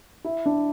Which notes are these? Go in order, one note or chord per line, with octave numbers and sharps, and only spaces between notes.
E4
D4